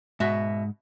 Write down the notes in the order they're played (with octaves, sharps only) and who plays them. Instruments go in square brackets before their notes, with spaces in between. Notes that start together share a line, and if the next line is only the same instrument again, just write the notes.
[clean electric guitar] G#2 [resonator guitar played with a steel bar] B2 F#4 E5